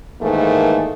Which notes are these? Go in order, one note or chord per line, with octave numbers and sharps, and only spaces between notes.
G#2 D#3 E3 A3 A#3